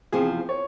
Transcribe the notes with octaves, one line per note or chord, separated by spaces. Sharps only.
E2 C3 F3 C4 G#4
C#5